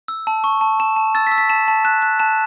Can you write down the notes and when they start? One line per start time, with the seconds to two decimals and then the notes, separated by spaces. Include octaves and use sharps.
0.08 E6
0.27 A5
0.44 C#6
0.61 A5
0.80 A5 E7
0.96 A5
1.15 E6 A6
1.27 B6
1.32 E6
1.38 B6
1.50 A5 E7
1.68 A5
1.85 F#6 E7
2.02 F#6
2.20 A5 E7